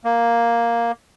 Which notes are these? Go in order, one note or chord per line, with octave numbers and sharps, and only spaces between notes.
A#3